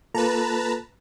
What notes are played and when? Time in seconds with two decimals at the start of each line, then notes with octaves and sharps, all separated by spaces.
0.14 A#3 F4 A4 B4 A5 A#5